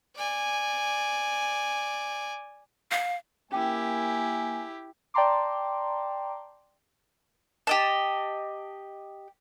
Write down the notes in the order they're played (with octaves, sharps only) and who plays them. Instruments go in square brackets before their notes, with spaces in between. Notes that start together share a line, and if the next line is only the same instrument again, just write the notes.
[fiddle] D5 G#5
[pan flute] F5
[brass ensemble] A#3 G#5 [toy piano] C#4 G5 D6 [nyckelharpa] E4 G4
[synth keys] D5 G5 A5 A#5 C6 D6
[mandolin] G4 D#5 A5